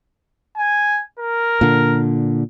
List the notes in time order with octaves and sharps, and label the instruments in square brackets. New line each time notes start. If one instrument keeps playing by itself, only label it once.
[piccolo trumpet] G#5
A#4
[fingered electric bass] A#2 D3